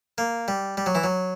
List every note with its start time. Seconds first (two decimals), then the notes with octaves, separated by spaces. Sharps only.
0.18 A#3
0.48 G3
0.77 G3
0.86 F#3
0.95 E3
1.04 F#3